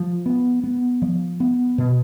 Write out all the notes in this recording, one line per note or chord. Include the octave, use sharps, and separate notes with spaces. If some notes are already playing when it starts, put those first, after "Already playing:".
Already playing: F3
B3
B3
F3
B3
B2